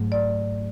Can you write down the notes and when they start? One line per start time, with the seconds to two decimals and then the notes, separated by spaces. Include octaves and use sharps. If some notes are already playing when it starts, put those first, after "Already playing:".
Already playing: G#2 F#3 A3
0.12 D5